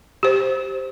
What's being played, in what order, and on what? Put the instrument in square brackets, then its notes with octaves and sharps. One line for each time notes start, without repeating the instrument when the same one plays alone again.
[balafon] G4 C5